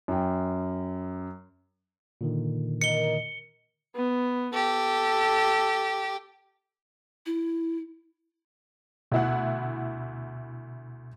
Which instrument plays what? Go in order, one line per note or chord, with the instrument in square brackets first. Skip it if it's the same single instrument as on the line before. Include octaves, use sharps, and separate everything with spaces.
[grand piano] F#2 G5
[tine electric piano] A#2 D3 D#3
[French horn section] A#4 D#5 [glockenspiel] C#7 G7
[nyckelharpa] B3
[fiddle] G4 [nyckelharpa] A4
[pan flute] E4
[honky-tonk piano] D2 E4 F#5 [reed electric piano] B2